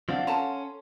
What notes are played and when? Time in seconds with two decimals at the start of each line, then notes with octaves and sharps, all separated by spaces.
0.09 F3 C4 D4 F5 F#5
0.27 C#4 A4 A5 A#5 C6